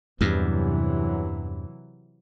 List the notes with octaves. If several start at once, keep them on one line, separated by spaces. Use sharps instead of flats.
E2 G2 C3 E3 F#3